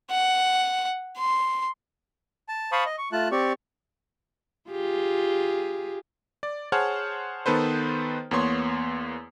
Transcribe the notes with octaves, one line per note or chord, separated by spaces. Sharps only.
F#5
C6
A5
C5 F5 A5 B5 C#6 D#6
D#5
C#6
A3 F4 A5 F#6
C4 G4 D5 C#6
F4 G4 G#4
D5
G#4 C5 C#5 F#5 A5 F6
D#3 B3 A4 B4 C5
E2 A#3 B3 C#5 C6